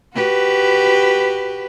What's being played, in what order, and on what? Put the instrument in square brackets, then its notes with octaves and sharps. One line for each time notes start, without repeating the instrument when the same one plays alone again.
[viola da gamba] F#4 G4 B4